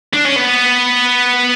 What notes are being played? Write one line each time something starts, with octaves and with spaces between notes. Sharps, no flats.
D4
C#4
B3